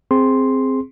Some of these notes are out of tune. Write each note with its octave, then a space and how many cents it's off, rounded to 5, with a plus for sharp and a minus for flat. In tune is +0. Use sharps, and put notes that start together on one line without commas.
C4 +0 G#4 +0 C6 +0